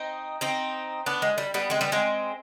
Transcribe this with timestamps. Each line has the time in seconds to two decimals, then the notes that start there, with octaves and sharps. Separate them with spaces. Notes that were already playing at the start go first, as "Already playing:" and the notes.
Already playing: C4 D#4
0.41 C4 D#4
1.06 B3 D4
1.22 G#3
1.38 G3
1.54 G3 B3
1.70 G#3 C4
1.81 G3 B3
1.92 G#3 C4